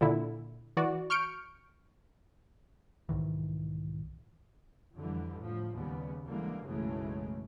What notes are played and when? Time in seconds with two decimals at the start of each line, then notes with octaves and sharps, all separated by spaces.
0.01 A#2 D3 E4
0.77 E3 F#4 D5
1.10 C#6 F6 G6 C#7 D7
3.09 B1 G#2 D#3 E3
4.97 F2 D3 E3 G3
5.37 A2 F3
5.74 D#2 C#3 G3 B3
6.27 D3 E3 G3 G#3 A#3
6.66 B1 F#2 C#3 E3 G#3 A3